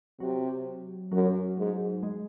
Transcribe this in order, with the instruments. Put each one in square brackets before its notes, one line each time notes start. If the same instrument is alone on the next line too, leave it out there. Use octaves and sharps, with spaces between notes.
[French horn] C3 [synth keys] F#3
[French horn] F#2 [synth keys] F#3
[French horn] G#2
[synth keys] G#3